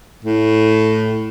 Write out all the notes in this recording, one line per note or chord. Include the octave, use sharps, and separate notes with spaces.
A2